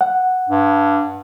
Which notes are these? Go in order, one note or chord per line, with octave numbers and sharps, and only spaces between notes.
F#5
G2